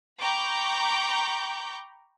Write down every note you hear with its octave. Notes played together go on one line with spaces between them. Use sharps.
G5 A#5 B5 C#6 D6 G6